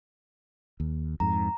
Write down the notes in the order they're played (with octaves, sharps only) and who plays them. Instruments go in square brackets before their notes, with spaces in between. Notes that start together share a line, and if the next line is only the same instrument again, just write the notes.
[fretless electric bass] D#2
[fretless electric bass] F2 G#2 [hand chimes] A#5